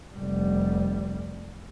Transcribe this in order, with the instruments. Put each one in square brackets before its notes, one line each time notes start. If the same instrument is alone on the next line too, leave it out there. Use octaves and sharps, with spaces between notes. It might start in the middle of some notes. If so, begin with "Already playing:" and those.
[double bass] F1 G3